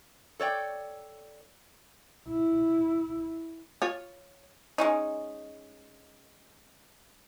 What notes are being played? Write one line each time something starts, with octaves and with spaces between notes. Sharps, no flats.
A4 C#5 D5 G5
E4
F4 C#5
G#3 C#4 D#4